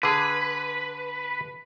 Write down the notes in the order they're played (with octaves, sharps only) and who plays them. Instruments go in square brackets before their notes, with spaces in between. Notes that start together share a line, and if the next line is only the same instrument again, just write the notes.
[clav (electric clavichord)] D3 G#4 [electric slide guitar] B4